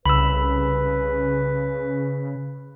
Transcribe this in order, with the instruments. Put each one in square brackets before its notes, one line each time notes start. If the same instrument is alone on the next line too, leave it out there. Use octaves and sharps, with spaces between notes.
[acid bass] C2 [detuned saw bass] C#3 [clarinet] B4 [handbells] B5 E6